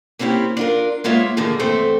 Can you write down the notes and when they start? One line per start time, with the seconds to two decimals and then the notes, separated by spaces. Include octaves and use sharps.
0.19 A#3 C4 C#4 E4 G4
0.57 D4 F4 A#4
1.04 G#3 A#3 B3 F4 C#5 E5
1.37 A2 D3 D#3 F3 A#3 G#4
1.59 E2 G2 A3 C4 C5